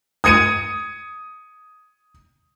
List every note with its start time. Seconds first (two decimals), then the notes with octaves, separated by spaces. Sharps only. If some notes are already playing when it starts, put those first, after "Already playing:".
0.24 D#6 G#6 C#7 D#7